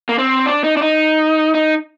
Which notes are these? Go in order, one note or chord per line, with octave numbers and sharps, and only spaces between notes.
A#3
C4
D4
D#4
D4
D#4
D#4